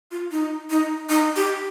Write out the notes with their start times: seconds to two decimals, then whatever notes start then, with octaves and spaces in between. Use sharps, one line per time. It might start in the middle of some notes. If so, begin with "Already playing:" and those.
0.11 F4
0.32 D#4
0.70 D#4
1.09 D#4
1.36 G4